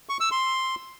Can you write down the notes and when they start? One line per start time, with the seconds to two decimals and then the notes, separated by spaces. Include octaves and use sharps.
0.09 C#6
0.20 E6
0.31 C6